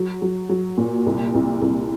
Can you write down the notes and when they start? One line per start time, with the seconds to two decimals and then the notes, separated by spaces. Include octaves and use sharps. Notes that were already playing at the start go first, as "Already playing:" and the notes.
Already playing: F#3
0.22 F#3
0.49 F#3
0.77 A#2
1.06 C2
1.34 C2
1.61 C2